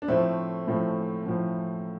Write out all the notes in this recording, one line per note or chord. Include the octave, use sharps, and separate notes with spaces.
D4
A2 F3 A3 C4
A2 F3
A2 F3